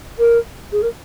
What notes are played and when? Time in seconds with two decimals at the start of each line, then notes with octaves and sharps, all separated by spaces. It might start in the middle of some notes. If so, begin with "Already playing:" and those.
0.18 A#4
0.72 G#4
0.82 A#4